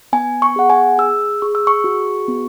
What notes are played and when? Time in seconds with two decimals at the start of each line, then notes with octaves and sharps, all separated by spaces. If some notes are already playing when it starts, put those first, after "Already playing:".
0.13 B3 G#5
0.42 C#6
0.56 G#4 F#5
0.70 G#5
0.98 G#4 E6
1.42 G#4 C#6
1.55 E6
1.67 C#6
1.84 F#4
2.28 B3